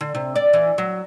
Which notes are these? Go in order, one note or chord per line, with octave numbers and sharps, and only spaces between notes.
D3
C3
D5
E3
F#3